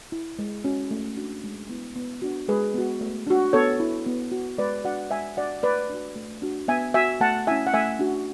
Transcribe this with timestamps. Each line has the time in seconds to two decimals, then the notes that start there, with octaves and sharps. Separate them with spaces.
0.12 E4
0.39 G#3
0.64 C#4 F#4
0.91 A3
1.17 D4 F#4
1.44 G#3
1.69 B3 E4
1.96 B3
2.22 D4 F#4
2.48 G#3 G#4 B4
2.74 B3 F#4
3.01 A3
3.27 D4 F#4
3.53 B3 A4 C#5
3.80 E4
4.06 B3
4.32 F#4
4.58 G#3 B4 D5
4.84 D4 F#4 D5 F#5
5.11 G#3 E5 G#5
5.37 D4 F#4 D5 F#5
5.63 A3 B4 D5
5.89 D4 F#4
6.15 A3
6.42 D4 F#4
6.68 B3 E5 G#5
6.94 F#4 E5 G#5
7.20 A3 F#5 A5
7.47 C#4 E4 E5 G#5
7.67 F#5
7.74 A3 E5 G#5
7.99 D4 F#4